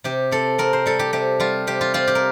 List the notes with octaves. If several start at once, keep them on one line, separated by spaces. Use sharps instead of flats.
C3 G4
C4 A4
C4 A#4
C5
G3 A4
G4
C3 G4
G3 F4
C3 G4
F4
C4 F4
G4
A#4